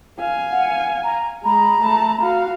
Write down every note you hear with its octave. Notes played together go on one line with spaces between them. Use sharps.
F5 G#5
F#5
A#5
G#3 G#4 A#5 B5
A3 A5
F#4 F5